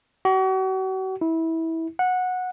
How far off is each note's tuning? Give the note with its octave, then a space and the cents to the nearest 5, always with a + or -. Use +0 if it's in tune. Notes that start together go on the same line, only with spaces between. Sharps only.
F#4 +40
E4 -20
F#5 -15